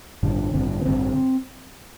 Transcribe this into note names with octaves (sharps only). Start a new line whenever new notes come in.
A1 G2 D3 D4
A1 G2 D3 C4
D4
B3
A1 G2 D3 C4